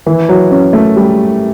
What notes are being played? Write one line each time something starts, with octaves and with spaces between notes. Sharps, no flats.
E3
F#3
C#4
A3
G3